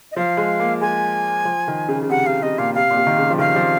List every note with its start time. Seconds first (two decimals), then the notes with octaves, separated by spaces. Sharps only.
0.12 D#5
0.16 F3 F5
0.37 G#3
0.59 A#3
0.81 G#3 G#5
1.45 F3
1.68 D#3
1.88 C#3
2.03 C#3
2.09 C3 F#5
2.26 C3 F5
2.42 C3 D#5
2.58 A#2 F5
2.75 C3 F5
2.90 A#2
2.96 C3
3.07 D#3
3.18 C#3
3.30 F3
3.39 D#3 F5
3.56 F3